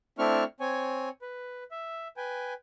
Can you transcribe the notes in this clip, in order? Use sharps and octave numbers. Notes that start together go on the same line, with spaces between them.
A3 C4 D4 E4 C#6 F6
C4 C#5 G#5
B4
E5
B4 G5 G#5